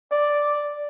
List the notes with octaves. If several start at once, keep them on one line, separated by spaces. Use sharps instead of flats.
D5